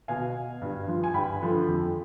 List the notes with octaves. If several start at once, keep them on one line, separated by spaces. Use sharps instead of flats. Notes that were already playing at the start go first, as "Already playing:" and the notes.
B2 F5 G#5
G2
F3
G#5
G2 G5 B5
D3 F3
F2